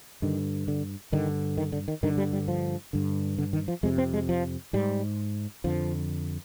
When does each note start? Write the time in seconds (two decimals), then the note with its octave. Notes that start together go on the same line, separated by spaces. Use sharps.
0.22 G2 D3 D#3
0.68 D3
1.12 G2 D3 D#3
1.58 D#3
1.72 D3
1.88 D#3
2.03 G2 D3 D#3
2.18 G3
2.33 G3
2.48 F3
2.93 G2 D3
3.38 D3
3.53 D#3
3.68 F3
3.83 F2 C3 G#3
3.98 C4
4.13 G#3
4.29 F3
4.73 G#2 G3
5.64 F2 D3 F3